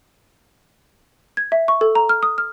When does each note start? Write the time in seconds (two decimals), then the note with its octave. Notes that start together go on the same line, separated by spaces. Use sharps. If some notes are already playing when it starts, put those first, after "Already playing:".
1.37 G#6
1.52 E5
1.68 C#6
1.81 A4
1.95 A#5
2.09 F6
2.23 D#6
2.38 F6